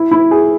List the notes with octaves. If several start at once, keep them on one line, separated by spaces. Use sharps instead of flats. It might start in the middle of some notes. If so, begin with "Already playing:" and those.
Already playing: E4
E4
G#4